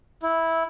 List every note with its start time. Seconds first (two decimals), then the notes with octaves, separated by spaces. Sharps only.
0.23 E4